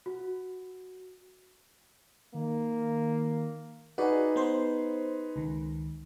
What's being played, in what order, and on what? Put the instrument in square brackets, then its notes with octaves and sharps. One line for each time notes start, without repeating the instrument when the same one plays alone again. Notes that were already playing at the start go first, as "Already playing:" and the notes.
[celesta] F#4
[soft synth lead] D#3 [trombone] A#3
[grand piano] D#4 G#4 B4 [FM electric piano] F#4 D5
[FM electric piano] B3 C5 C6
C#2 D#3